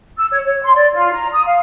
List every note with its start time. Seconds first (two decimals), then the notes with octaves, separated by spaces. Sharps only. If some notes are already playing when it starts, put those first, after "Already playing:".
0.17 E6
0.30 C#5
0.45 C#5
0.63 C6
0.75 D5
0.93 F4
1.14 A#5
1.32 D#6
1.46 F5